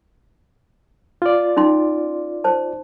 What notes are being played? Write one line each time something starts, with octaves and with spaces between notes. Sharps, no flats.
F4 D5
C#4 D#4 C6
C5 A5